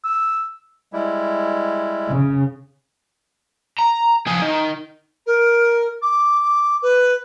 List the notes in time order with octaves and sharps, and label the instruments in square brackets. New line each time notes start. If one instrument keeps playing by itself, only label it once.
[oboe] E6
[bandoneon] G3 G#3 E4
[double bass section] C#3
[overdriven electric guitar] A#5
F3 G#4
D#3
[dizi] A#4
D6
B4